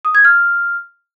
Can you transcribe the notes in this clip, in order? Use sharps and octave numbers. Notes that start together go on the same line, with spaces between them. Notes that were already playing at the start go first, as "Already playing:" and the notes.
D#6
G#6
F6